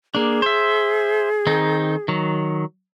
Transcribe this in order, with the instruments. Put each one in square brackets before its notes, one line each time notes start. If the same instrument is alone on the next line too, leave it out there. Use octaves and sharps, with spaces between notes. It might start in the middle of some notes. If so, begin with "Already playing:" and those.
[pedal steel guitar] A#3 D4 [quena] G#4
[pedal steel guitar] C5 E5
D#3 C4 D#4
D#3 F#3